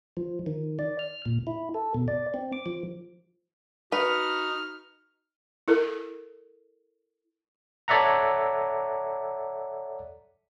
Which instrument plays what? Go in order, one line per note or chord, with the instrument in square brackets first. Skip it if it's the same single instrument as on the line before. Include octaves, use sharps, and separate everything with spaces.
[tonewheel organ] F3
D#3
D5
F6
A#2
E4
A4
B2
D5
C4
D6
F3
[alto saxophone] D#4 [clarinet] F#4 [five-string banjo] B4 [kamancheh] F6
[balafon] E4 A4 A#4
[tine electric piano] A4 C#5 D5 E5 F#5 A#5